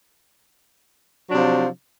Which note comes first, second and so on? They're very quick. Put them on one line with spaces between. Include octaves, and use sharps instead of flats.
F#3 D4 C3 F3